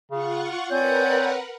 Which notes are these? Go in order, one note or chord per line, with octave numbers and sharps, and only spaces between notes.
C#3 F4 F#5 C#6
C4 A#4 B4 C#5 D5 F#5 G#5 G6